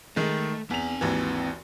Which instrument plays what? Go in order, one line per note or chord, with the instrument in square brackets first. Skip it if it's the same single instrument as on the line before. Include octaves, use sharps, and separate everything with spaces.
[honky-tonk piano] D#3 G#3 [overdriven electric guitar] A3
[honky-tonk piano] E2 F7 [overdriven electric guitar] C4 G#5
[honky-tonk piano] G#1 D#2 E3